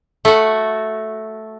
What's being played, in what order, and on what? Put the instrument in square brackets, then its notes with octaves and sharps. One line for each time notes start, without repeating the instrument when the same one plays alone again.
[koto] A3 F#4